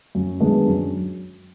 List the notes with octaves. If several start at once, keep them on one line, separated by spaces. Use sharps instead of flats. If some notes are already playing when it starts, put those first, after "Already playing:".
F#2
D#3 G#3 B3 D4
F#2